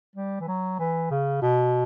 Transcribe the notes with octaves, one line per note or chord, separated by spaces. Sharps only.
G3
E3
F#3
E3
C#3
B2